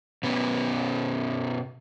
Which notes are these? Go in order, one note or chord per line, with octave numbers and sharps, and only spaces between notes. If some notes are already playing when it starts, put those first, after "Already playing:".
B2 B3 C#4